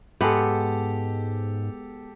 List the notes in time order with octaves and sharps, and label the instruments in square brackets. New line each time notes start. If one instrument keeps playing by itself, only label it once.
[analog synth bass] G#2 [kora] G#3 B3 [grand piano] G4 A4